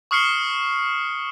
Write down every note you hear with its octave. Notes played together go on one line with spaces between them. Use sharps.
C#6 D#6 F6 C7 C#7 G7